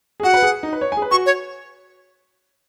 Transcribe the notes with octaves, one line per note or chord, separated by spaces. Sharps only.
G#4
F#4 F#5
B4
G#4
D#4
B4
C#5
G#5
G#4
B4
F#4 C#6
C#5